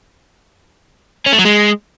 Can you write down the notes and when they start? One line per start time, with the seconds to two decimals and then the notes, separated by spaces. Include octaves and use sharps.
1.26 C#4
1.33 A3
1.39 F#3
1.45 G#3